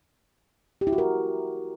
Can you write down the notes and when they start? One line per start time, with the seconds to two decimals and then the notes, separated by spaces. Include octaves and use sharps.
0.81 G4
0.87 E4
0.93 F#4
0.98 A#4